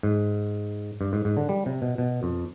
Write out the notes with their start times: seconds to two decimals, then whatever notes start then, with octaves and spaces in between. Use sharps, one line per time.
0.03 G#2
1.01 G2
1.13 G#2
1.25 G#2
1.37 D3
1.49 G3
1.66 C3
1.82 B2
1.98 B2
2.23 F2